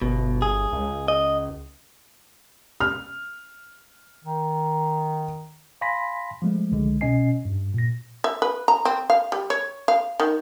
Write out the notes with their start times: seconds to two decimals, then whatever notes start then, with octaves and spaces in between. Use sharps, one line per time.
0.02 G1 B2
0.42 G#4
0.73 C#2
1.08 D#5
2.80 F6
4.24 D#3
5.81 F5 G#5 B5 C6 A#6 B6
6.42 F3 G#3 A3
6.72 C2 D3 G#3
7.01 B2 C#4 D#5 G#5 C7
7.45 G2
7.74 A#2 A#6
8.24 E5
8.42 B4
8.68 A#5
8.85 C4
9.10 F5
9.32 G3
9.50 C#5
9.88 F5
10.20 D#3